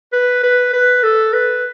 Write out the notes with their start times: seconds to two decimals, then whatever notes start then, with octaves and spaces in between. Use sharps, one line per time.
0.13 B4
0.43 B4
0.73 B4
1.03 A4
1.33 B4